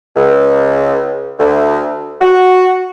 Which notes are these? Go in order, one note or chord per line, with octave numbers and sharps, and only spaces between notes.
C#2
D2
F#4